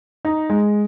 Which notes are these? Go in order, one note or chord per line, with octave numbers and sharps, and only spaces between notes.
D#4
G#3